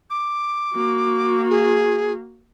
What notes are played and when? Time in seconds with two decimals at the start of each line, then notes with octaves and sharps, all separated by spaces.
0.10 D6
0.74 A#3 F#4
1.50 G#4